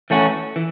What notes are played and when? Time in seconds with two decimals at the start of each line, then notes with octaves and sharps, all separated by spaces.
0.10 E3 A3 C#4 F#4
0.56 E3